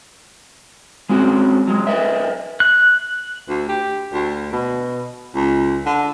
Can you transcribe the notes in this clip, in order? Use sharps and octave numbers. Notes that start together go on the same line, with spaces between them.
G#3 C4 C#4 F#4
F#3 G#3
A#4 B4 D#5 E5
F#6
D2
G4
D2
B2
C#2
D3